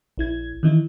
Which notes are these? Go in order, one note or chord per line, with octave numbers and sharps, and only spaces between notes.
A#1 E4 G#6
D#3 E3 D#4 E4